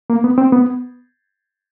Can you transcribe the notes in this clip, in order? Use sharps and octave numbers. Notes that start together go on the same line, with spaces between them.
A#3
B3
C4
B3